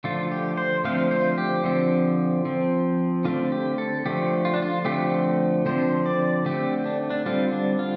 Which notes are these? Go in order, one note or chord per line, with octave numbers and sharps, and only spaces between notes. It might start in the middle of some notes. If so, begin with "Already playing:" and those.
D3 F3 A3 F4
G4
C5
D3 F3 A3 C4 F5
C5
G4
D3 F3 C4
F3 C4
D3 A3 C4 F4
G4
A4
D3 F3 A3 G4
F4
D4
F4
D3 F3 A3 C4 G4
D3 F3 C4 C5
D5
D3 A3 C4 G4
D4
D4
D3 G3 C4 F4
D4
F4